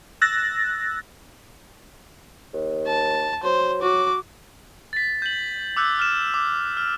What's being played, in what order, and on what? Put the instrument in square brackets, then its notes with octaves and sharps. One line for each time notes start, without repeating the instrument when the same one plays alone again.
[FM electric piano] E6 F#6 A6 A#6
[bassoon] D#2
[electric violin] A5
[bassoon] F#3 [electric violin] C5
[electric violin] F#4 D6
[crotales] A6 B6
G6 F#7
D6 E6 F#6 G6
F6 E7
D6
F6